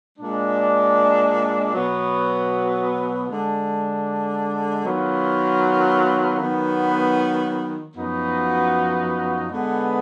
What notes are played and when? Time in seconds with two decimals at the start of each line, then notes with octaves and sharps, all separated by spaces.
0.18 A#2 G#3 D4
1.74 B2 F#3 B3
3.29 D3 G#3 D4
4.84 D#3 F#3 B3 F4 A#4
6.39 D#3 F#3 B3
7.95 F#2 F3 B3 D#4 F#4
9.50 D3 G#3 B3